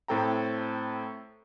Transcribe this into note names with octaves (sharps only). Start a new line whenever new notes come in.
A2 C4 A4 G5 A#5